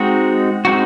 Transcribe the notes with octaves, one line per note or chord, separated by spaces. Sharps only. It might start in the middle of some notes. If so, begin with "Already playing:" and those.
Already playing: G#3 C4 D#4 F#4
G#3 C4 D#4 F#4